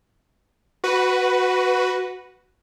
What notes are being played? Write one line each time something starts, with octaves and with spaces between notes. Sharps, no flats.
F#4 B4